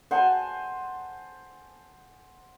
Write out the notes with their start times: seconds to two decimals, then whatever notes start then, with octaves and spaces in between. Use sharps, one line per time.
0.11 C5 F#5 G#5 A5